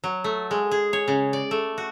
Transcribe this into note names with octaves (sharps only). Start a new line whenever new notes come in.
F#3
A3
G#3
G#4
C#5
C#3
D5
A3
F#4